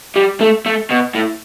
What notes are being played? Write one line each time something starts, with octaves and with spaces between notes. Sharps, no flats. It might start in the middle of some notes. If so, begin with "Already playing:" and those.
G3
A3
A3
B2
A2